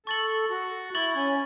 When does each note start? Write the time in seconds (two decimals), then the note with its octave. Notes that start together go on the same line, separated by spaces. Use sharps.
0.06 A4 C#6 A6 F#7
0.50 F#4
0.94 E4 C#6 A6 F#7
1.15 C#4